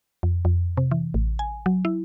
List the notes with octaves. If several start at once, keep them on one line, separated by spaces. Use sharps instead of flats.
F2
F2
C3
E3
A1
G#5
F#3
E4